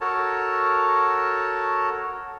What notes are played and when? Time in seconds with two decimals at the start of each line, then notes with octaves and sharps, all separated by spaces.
0.01 F#4 A4 A#4 C#5 A5